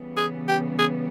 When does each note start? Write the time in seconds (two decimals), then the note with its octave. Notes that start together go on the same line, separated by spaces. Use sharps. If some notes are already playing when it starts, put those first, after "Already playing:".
Already playing: C#3 E3 G3 B3
0.17 G#4
0.48 G4
0.78 G#4